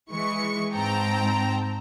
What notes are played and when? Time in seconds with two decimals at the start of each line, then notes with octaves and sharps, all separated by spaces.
0.10 E3 G#3 C#6 C#7
0.74 G#2 C4 G5 A5 A#5